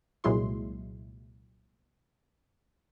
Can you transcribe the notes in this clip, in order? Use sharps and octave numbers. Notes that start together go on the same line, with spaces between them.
C2 A#2 F#3 G#3 E4 C6